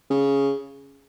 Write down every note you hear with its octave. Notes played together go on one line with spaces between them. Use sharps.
C#3